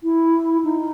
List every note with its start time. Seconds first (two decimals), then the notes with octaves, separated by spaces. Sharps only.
0.03 E4
0.64 D#4